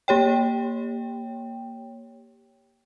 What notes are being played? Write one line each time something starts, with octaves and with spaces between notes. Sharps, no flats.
A#3 G4 C#5 G5